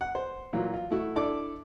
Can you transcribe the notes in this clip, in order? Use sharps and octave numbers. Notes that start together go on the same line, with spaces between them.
F#5
C5
A#2 E3 F#3 F4
F4
A3 E4 F#4
D4 E4 A4 D5 D6